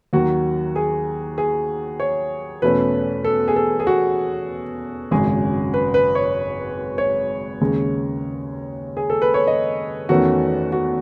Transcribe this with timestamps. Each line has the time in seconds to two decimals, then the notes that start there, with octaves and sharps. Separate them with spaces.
0.13 D#2 D#3 F#3 F#4
0.76 G#4
1.38 G#4
2.00 C#5
2.62 E2 B2 A3 C#4 B4
3.25 A4
3.48 G#4
3.56 A4
3.80 G#4
3.87 F#4
5.11 G#1 F#2 C#3 G#3 G#4
5.74 B4
5.94 B4
6.15 C#5
6.98 C#5
7.61 D#2 C#3 G#3
8.97 G#4
9.10 A4
9.22 B4
9.34 C#5
9.47 D#5
10.09 E2 D#3 A3 C#4 F#4
10.72 F#4